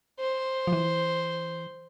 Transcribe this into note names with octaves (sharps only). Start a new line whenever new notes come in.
C5
F3
E3